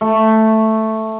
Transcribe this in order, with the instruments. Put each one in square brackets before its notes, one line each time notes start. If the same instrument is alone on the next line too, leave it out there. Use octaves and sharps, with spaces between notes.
[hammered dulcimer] A3